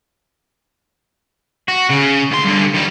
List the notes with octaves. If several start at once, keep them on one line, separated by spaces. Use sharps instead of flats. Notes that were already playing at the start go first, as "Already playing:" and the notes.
F#4
C#3
D2 C6
G2 D3
D#3 G3